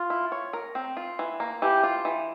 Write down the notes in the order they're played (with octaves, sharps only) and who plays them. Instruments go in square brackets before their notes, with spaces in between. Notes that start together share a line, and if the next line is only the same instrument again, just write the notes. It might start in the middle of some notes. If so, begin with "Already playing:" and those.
Already playing: [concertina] F4
[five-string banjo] E4
C#5
A#4
C4
F4
E3
A#3
[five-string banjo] E3 [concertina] G4
[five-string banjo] F4
E3